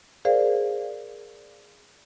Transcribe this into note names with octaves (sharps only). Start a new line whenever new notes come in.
G#4 A#4 C5 D5 F5